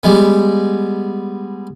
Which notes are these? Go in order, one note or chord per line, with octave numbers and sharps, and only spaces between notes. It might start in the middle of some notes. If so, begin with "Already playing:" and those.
G3 G#3 B3